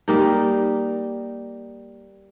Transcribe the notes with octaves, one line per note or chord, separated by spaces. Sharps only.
G3 A#3 D#4